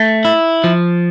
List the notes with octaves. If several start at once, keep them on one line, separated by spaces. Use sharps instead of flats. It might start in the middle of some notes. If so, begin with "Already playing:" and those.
Already playing: A3
E4
F3